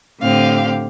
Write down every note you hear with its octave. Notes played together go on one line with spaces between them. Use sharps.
A2 D3 C4 G4 F5